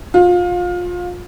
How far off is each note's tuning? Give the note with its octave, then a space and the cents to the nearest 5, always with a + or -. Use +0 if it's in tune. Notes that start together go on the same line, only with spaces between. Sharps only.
F4 +25